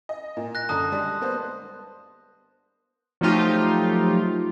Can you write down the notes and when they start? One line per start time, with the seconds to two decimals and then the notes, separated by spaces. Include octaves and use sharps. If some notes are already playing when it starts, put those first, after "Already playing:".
0.09 D#5
0.37 A#2
0.55 F#6 A#6
0.69 F#2 D3 A5 D#6
0.92 G3 G#3 D4
1.21 A#3 B3 C5
3.21 F3 F#3 A3 D#4 F4 G4